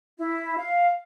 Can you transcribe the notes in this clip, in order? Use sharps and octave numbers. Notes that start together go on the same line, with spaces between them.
E4
F5